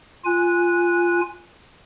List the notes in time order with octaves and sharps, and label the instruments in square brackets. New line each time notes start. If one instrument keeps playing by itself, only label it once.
[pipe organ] F4 G#5 F#6